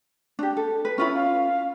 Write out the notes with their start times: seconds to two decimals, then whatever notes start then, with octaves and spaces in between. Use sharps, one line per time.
0.39 D4 G4
0.57 A4
0.85 B4
0.98 C#4 E4 F4 B5
1.15 F5